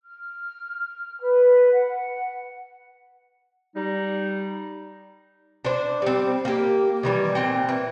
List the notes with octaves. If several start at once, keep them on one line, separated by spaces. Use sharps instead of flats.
F6
B4
F#5
G3 D#4
D4 C5
G3 C4
A#3 G4
D#3 E3 G3
A#2 C4 G5
E3